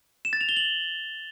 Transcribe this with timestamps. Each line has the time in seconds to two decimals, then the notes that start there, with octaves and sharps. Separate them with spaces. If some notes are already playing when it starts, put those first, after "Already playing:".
0.25 E7
0.33 A6
0.41 F7
0.49 G7
0.57 F#7